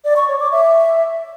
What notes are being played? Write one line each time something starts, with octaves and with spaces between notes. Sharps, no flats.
D5
C#6
C#5
D6
E5